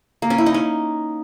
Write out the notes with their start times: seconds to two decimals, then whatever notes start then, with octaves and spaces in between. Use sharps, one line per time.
0.22 A#3
0.30 C#4
0.38 E4
0.46 D#4
0.54 C#4